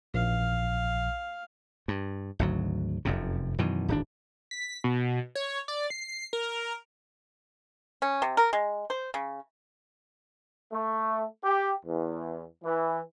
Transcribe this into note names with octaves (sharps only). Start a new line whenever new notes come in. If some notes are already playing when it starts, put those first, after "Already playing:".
A#1 F5
G2
G#1 D2 F#3
F1 F#2 C3
F#2 B2 D#3 E3
D1 G#1 D4
B6
B2
C#5
D5
C7
A#4
C#4
C3
A#4
G#3
C5
C#3
A3
G4
E2
E3